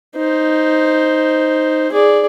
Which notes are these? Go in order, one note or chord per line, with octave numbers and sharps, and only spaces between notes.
D#4 C5
G#4 D5